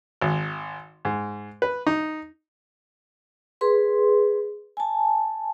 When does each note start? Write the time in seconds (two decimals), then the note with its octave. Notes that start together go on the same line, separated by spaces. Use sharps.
0.21 G#1
1.05 G#2
1.62 B4
1.87 D#4
3.61 G#4 B4 C6
4.77 G#5 A5